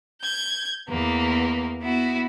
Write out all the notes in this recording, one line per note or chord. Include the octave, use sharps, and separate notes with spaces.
G6 G#6
E2 A#3 B3
B3 E4 F#4